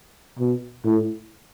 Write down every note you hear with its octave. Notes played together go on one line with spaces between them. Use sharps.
B2
A2